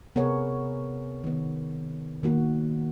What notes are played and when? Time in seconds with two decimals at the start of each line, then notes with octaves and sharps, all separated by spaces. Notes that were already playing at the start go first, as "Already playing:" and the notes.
0.15 C3 B3 G#4 A#4 C#5 F#5
1.24 D#3 B3
2.23 D#3 A#3 F#4